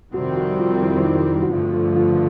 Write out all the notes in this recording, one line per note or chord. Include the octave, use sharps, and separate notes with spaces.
F2 C3 D#3 G3 C4 F#4
F#4
F4
E4
E4
D#4
E4
F#4
G2 D3 F3 A3 F4
F4
F4